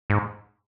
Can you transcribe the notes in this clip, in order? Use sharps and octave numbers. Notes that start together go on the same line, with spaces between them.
G#2